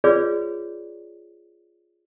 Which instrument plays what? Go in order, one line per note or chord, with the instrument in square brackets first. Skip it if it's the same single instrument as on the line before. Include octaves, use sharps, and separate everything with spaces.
[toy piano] F4 G#4 B4 C#5 D5